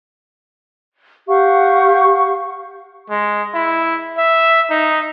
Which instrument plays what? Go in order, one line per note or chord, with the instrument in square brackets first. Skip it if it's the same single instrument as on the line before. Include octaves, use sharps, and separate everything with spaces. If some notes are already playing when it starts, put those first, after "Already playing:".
[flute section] G4 F5 F#5 C#6
[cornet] G#3
E4
E5
D#4